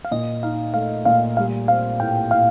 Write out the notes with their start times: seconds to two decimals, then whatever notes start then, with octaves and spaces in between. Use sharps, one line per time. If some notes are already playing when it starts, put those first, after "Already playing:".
0.05 F5
0.11 A#2 D#5
0.43 D#4 F5
0.74 A3 F5
1.05 A#2 F5
1.37 G3 F5
1.68 C4 F5
2.00 A2 G5
2.31 A2 F5